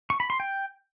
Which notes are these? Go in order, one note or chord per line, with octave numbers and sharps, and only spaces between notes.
C#6
B5
C6
G5